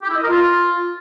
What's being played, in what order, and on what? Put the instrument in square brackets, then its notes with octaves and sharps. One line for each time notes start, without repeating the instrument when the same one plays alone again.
[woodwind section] G4
E4
D#5
A#4
F4